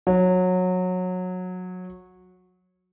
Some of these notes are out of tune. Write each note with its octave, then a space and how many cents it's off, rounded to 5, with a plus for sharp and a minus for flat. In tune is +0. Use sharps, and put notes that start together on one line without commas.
F#3 -20